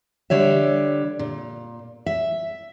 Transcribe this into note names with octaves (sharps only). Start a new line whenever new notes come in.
D3 G3 C#5 E5
A#2
E5